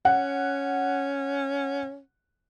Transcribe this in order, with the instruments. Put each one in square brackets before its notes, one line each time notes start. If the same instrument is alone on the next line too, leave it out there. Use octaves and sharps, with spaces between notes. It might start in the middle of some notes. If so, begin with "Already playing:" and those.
[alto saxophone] C#4 [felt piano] F#5